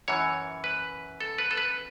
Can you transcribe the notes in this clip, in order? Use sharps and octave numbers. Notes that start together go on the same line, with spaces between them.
F#2 E3 C#5
B4
A4
B4
A4
B4